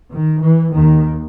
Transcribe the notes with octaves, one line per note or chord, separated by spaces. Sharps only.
D#3
E3
D#2 D#3